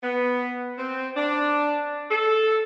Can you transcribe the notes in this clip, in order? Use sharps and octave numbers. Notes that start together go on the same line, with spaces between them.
B3
C4
D4
A4